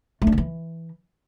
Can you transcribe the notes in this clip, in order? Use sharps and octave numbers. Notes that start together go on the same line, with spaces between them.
A3
D4
D#3
E3